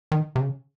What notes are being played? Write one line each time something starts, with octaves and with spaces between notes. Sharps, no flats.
D#3
C3
C#3